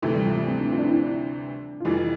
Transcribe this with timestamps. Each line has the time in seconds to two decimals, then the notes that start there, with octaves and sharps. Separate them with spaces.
0.02 D2 C3 E3 A3
0.14 G3
0.26 F3
0.36 F3
0.48 C4
0.60 D4
0.71 F4
0.78 D4
0.82 E4
0.93 D4
1.80 F4
1.84 F1 F2 E3 G3 E4
1.98 E4